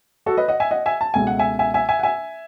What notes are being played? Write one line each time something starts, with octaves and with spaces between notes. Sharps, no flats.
F#4 A4
B4 D#5
D#5 F#5
E5 G#5
D#5 F#5
E5 G#5
A5
C#2 B2 A3 G#5
F#5
E5 G#5
E5 G#5
E5 G#5
E5 G#5
F#5
E5 G#5